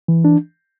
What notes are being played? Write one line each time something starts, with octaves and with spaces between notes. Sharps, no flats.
E3
D4